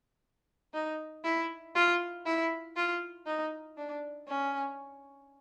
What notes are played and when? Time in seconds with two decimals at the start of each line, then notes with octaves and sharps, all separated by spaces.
0.74 D#4
1.25 E4
1.75 F4
2.26 E4
2.76 F4
3.26 D#4
3.77 D4
4.28 C#4